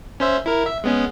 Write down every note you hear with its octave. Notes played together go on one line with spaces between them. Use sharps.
C#4 C5 E5
E4 A#4
E5
G#3 B3 C#4